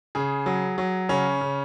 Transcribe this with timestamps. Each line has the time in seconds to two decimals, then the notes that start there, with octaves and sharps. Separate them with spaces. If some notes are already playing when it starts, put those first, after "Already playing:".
0.15 C#3 G#4
0.46 F#3
0.78 F#3
1.09 C#3 C#4
1.41 C#3